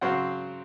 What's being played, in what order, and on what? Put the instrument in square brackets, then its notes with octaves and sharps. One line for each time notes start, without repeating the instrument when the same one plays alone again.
[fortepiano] C#3 F#3 C4 F#4 C5